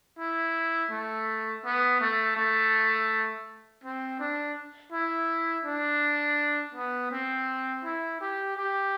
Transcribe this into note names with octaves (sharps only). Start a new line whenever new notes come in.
E4
A3
B3
A3
A3
C4
D4
E4
D4
B3
C4
E4
G4
G4